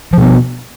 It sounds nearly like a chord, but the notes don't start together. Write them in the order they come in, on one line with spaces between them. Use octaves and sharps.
F3 B2 B3